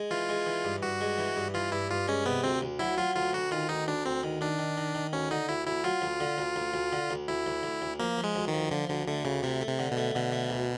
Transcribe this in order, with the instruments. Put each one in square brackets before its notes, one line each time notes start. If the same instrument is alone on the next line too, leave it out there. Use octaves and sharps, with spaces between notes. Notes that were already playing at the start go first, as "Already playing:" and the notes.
Already playing: [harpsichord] G#3
[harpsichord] E3 [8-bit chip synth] F4
[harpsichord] G#3
E3
G2
[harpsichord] G2 [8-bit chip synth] F#4
[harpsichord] G#3
E3
G2
[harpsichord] E3 [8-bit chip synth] F4
[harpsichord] G2 [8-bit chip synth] E4
[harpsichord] G2 [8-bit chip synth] F4
[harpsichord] G#3 [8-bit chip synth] C#4
[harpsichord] C3 [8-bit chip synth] B3
[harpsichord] D2 [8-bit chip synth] C4
[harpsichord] D2
[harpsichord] F#3 [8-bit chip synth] E4
[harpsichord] F#3 [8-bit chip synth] F4
[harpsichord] D2 [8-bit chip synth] F4
[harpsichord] D2 [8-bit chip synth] F#4
[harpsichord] D#3 [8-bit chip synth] F4
[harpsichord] D2 [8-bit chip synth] D#4
[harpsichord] D2 [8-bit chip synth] D4
[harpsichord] D2 [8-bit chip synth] C4
[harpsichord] D#3
[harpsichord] D#3 [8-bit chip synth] D4
[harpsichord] D#3
D#3
D#3
[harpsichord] D2 [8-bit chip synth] C#4
[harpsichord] D3 [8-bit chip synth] D#4
[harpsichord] D2 [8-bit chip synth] E4
[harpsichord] D2 [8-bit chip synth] E4
[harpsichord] F#3 [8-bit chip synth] F4
[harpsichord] D2
D3
D2
D2
D2
D3
D2
[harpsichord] D2 [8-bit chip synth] E4
[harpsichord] D2
D2
D2
[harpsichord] F3 [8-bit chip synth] A#3
[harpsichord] F3
[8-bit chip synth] G#3
[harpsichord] D2
[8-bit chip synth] D#3
[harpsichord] F3
[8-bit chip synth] D3 [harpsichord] F3
[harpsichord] D2 [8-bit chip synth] D3
[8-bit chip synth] D3 [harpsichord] A3
[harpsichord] D2 [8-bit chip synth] C#3
[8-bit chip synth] C3 [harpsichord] A3
[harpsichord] A3
[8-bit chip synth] C3
[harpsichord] D3
[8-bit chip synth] B2
[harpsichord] A3
[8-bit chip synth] B2 [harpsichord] D3
[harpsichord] A3
D2